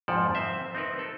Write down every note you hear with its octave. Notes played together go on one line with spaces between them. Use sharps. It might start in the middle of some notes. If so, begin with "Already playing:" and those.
F2 G#2 F3 A4 D5
C4 C5 E5
C4 D#4 A#4 B4
A4